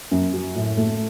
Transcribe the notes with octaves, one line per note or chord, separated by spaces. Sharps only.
F#2
F#3
A2
A3